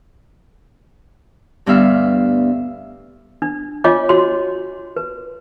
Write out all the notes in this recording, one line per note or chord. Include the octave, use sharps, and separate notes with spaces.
D2 G2 G3 B3 E5 F5
D4
F4 C#5 D#5 G#5 D6
F#4 C#5 C6
B4